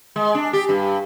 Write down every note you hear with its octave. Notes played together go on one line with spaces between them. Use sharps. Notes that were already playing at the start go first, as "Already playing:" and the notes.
G#3
D4
G4
G2